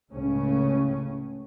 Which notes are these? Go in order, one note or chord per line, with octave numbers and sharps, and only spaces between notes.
C#2 A2 C#3 C#4